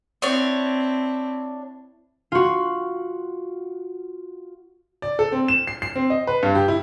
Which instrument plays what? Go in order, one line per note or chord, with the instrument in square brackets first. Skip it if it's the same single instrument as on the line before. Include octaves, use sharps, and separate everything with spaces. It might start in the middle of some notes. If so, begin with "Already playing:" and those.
[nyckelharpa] C4 E4 [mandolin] D4 C#5
[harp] F4 F#4
[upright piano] D5
A4
C4
E7
C7
C7
C4
D#5
B4
G2
G4
E4